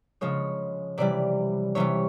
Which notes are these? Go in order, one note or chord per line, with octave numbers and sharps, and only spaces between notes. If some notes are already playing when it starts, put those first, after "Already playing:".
C#3 F3 G#3 C#5
C3 E3 G3 D5
C3 E3 G3 C#5